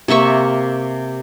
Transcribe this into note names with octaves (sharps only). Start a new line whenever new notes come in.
C3 A#3 E5 C#6